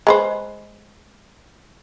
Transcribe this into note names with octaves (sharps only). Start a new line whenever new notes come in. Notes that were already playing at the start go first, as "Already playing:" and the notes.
G#3 B4 C5